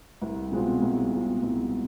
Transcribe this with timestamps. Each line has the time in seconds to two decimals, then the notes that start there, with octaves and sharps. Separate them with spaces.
0.22 C2
0.52 B2 G#3 C4 F4
0.82 C2
1.12 B2 G#3 C4 F4
1.42 C2